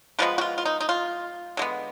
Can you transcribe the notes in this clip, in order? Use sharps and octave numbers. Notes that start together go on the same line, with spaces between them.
D3 F3 G#3 B3 B4
F#4
F4
F4
D#4
D#4
F4
D3 G#3 B3